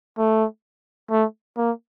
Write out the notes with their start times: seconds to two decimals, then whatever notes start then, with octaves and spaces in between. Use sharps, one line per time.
0.18 A3
1.10 A3
1.57 A#3